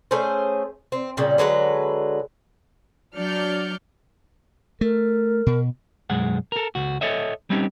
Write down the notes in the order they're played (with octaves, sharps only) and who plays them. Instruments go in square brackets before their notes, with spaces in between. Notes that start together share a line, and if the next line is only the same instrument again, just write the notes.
[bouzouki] A3 C#4 G#4 C5
C4
A#2 C#3 G3
D3 F#3 G#3 B4
[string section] F#3 D4 D5 F6 G6 C#7
[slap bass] A3 [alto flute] A#4
[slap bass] B2
[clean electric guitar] B1 F#2 G#3 F#5
A4 A#4
C#2 F#4
A4 C#5 D#5 E5
G3 C4 C#4 D#4 G4